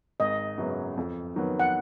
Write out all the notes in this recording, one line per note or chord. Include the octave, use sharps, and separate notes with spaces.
G#1 D#5
F#2 C#3 F#3 B3
F2
D#3 F#3 B3
F#5